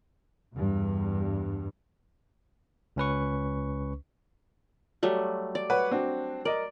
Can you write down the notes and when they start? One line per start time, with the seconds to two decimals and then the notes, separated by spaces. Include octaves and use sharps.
0.53 E2 G2
2.96 C#2 C#4 B4 C#6
5.03 F#3 G3 A3
5.55 D5
5.70 B4 C#5 F#5
5.91 C4 D4 F#4
6.45 A#4 D5 D#5